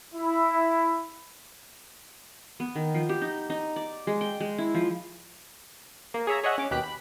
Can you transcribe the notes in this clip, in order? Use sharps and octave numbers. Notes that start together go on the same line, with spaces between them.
E4
B3
D#3
F3
G4
D#4
D#4
D5
G#3
G5
G#3
E4
F3
A#3
G#4 C#5 E5 A#5
G#4 C#5 D#5 E5 F#5
C#4 D6
D#2 B2 G4 F#6 B6 D7
B5